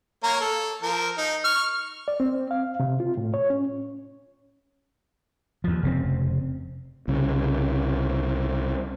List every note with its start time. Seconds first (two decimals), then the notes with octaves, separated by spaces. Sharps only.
0.24 A#3 C#5 A#5
0.41 A4
0.83 F3 A#4
1.18 D#4
1.44 C#6 F6
2.08 D5
2.20 C4
2.51 F5
2.80 C3
3.00 F4
3.17 A2
3.34 C#5
3.50 C#4
5.64 D#2 F3
5.83 F1 C#3 C4
7.08 C2 C#3